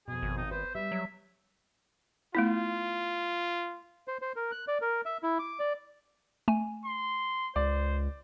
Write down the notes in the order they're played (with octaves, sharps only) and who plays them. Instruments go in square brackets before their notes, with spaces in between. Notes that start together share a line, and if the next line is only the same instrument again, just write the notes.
[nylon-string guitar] F2 B2 [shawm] G#4
[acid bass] G#1
[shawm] D#4
[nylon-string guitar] B4 [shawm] C5
[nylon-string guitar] G3 [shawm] E5
[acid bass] F#3
[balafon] A3 B3 E4 [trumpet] F4
[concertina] C5
C5
A#4
F#6
D5
A#4
E5
E4
D6
D5
[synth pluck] A3 G#5
[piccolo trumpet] C6
[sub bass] C#2 [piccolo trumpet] C5 [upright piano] D5